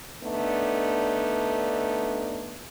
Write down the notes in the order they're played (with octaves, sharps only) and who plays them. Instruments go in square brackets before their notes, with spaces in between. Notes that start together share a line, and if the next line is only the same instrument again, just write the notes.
[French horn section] D3 A3 B3 D4 D#4